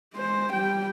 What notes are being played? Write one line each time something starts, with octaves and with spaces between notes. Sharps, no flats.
G#3 C5
G3 G5